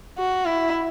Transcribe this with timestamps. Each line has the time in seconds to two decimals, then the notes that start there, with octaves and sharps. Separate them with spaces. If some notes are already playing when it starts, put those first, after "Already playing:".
0.18 F#4
0.45 E4